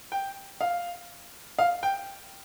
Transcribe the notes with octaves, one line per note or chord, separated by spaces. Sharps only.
G5
F5
F5
G5